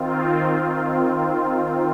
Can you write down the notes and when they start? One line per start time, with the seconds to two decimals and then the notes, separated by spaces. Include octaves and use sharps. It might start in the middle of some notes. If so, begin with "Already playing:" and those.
Already playing: D#3 C4 F4